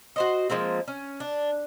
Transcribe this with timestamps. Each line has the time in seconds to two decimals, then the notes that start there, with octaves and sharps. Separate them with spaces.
0.16 F#4 C5 D#5
0.49 F3 G#3 A#3 C4
0.88 C#4
1.20 D4